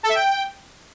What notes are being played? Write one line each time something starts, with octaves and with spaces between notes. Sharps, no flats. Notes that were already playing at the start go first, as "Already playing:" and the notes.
A4
E5
G5